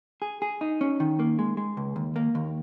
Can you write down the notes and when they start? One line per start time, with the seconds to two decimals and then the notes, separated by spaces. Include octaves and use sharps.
0.22 G#4
0.42 G#4
0.61 D#4
0.81 C#4
1.00 D#3
1.20 A#3
1.39 G#3
1.57 G#3
1.77 C#2
1.96 D#2
2.16 A#3
2.35 D#2